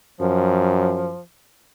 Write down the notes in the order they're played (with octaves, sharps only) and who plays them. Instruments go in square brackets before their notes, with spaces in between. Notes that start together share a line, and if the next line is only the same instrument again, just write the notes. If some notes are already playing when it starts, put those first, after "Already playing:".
[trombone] F#2 [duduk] F3